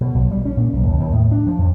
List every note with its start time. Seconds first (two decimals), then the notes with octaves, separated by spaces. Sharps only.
0.01 B2
0.15 B1
0.31 G3
0.45 C#4
0.57 A#2
0.73 B1
0.87 D#2
1.00 D#2
1.12 A2
1.32 D4
1.47 F3
1.59 F2